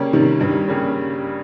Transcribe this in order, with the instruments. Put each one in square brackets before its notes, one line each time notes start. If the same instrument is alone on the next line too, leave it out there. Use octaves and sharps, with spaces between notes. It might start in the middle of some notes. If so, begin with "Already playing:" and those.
Already playing: [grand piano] C#3 G3 A#3 C#4
[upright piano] C3 D#3
G2
[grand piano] C#3 G3 A#3 C#4